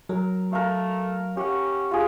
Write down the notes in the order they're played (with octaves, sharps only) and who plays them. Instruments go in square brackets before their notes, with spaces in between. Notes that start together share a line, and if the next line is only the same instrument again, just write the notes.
[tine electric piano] F#3 [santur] A#4
[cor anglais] A3 [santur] A#4 F5
[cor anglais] C#4 [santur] G4 F#5
[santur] F4 G#4